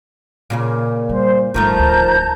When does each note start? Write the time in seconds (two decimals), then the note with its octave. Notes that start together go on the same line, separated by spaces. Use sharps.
0.50 A#2 C#3 A#3
1.09 G3 C5
1.54 G1 G2 D#3 F3 A3 A5 A#5 G6
1.76 D1 D2